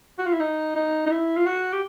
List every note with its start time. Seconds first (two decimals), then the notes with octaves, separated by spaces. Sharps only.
0.19 F#4
0.26 F4
0.33 E4
0.40 D#4
0.76 D#4
1.06 D#4
1.11 E4
1.37 F4
1.46 F#4
1.73 G4